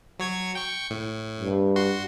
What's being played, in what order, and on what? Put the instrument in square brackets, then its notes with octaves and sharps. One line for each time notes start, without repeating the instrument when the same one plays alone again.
[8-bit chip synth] F#3 C#5 G#6
G5 C#6
A2
[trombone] G2
[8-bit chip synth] F#4 C6